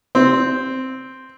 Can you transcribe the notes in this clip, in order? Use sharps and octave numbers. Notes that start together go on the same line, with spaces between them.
C4